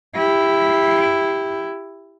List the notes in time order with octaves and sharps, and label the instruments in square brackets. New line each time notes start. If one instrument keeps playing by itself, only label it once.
[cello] E4 G4